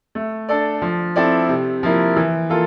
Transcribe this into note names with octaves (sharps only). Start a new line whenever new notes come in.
A3
D4 A4 D5
F3
C4 E4 A4 D5
C3
F3 A#3 E4
E3
A#3 F4 A4